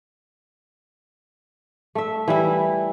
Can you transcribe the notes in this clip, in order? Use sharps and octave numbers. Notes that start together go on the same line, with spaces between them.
A3 E5
E3 G3 E4